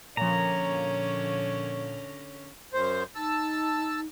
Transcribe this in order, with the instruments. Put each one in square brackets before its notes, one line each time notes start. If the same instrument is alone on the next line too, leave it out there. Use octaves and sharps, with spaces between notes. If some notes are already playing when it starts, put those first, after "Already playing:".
[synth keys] A#2 F3 [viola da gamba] D3 C#4 [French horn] C#5 [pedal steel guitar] A#5
[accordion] F#2 C5
[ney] D#4 [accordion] A5 E6